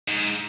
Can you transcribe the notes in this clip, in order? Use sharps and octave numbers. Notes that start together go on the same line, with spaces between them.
G#2